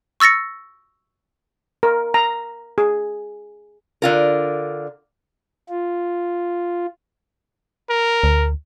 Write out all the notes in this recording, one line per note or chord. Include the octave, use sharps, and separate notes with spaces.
C#6 E6 A6 A#6 C#7
A#4
A#5
G#4
D3 F4 A#4
F4
A#4
D2